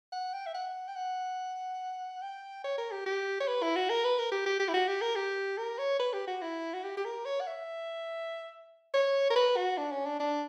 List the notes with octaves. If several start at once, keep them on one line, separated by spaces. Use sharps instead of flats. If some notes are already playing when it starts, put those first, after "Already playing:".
F#5
G5
E5
F#5
G5
F#5
G5
C#5
A#4
G4
G4
C#5
B4
E4
F#4
A#4
B4
A#4
G4
G4
G4
E4
F#4
G4
A#4
G4
A#4
C#5
B4
G4
F#4
E4
F#4
G4
G4
A#4
C#5
F#5
E5
C#5
A#4
B4
F#4
D4
C#4
D4
D4